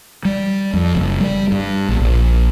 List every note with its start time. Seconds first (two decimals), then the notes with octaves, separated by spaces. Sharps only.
0.25 G3
0.73 F2
0.95 F#1
1.20 G3
1.52 G2
1.89 A#1
2.01 A#1